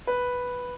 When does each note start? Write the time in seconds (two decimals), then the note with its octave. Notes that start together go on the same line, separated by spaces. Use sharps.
0.07 B4